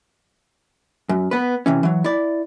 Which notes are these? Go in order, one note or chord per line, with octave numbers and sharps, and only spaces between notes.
F#2
B3 B4
C3 E3 C#4
E3 F#3
E4 D5